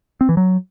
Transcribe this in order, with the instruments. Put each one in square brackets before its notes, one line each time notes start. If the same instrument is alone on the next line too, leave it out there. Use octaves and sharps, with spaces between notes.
[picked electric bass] C4
E3
F#3